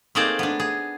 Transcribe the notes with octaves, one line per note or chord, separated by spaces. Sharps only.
A3 A#3 C4 D#4 G#4 D5
B3 D4
G#4